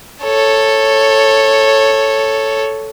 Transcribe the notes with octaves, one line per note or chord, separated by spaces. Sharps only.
A4 C#5